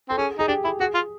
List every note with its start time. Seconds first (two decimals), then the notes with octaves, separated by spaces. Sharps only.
0.09 C4 A4
0.18 C#4 G#4
0.39 D#4 G#4
0.48 D4 G4
0.64 E4 G#4
0.80 F#4 G#4
0.95 F4